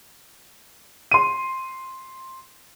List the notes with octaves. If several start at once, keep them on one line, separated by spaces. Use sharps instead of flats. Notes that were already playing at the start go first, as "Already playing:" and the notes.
C6 D#7